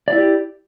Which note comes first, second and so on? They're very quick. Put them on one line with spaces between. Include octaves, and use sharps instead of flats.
D5 E4 G4